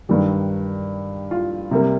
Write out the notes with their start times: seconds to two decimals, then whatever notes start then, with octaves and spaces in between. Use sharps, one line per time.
0.09 G2 D#3 G3
1.31 F4
1.71 C3 G3 A#3